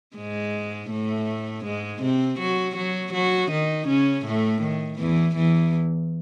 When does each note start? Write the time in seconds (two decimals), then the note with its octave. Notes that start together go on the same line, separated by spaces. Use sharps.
0.17 G#2 G#3
0.90 A2 A3
1.65 G#2 G#3
2.02 C3 C4
2.39 F#3 F#4
2.76 F#3 F#4
3.13 F#3 F#4
3.51 D#3 D#4
3.87 C#3 C#4
4.25 A2 A3
4.62 D#3
4.99 E2 E3
5.36 E2 E3